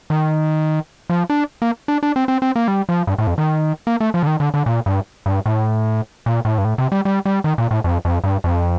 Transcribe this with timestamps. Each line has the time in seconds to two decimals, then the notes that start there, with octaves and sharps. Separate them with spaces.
0.10 D#3
1.10 F3
1.30 D4
1.62 A#3
1.88 D4
2.03 D4
2.16 C4
2.28 C4
2.42 C4
2.56 A#3
2.68 G3
2.89 F3
3.07 G2
3.18 A2
3.27 F2
3.38 D#3
3.87 A#3
4.00 A3
4.14 F3
4.22 D3
4.27 D#3
4.40 D3
4.54 D3
4.66 A#2
4.86 G2
5.26 G2
5.46 A2
6.26 A#2
6.45 A2
6.58 G2
6.65 A2
6.78 C3
6.92 G3
7.05 G3
7.25 G3
7.44 D#3
7.58 A#2
7.71 A2
7.84 F2
8.05 F2
8.24 G2
8.44 F2